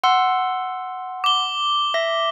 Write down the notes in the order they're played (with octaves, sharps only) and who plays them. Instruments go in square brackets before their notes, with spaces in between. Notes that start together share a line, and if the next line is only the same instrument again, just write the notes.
[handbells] F#5 C6 E6
[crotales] D6 G7
[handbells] E5 A#6